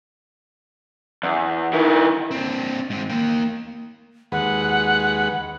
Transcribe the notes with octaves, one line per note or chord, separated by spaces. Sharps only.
E2
D#3 E4
C4 D4
G#2 C4
A#3 G5
D#2 G#3 B4 F#5